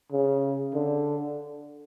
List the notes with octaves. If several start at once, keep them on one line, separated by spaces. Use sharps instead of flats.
C#3
D3